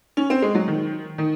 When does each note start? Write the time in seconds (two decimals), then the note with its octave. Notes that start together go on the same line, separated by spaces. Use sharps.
0.17 C#4
0.30 C4
0.42 G#3
0.55 F#3
0.68 D#3
1.18 D#3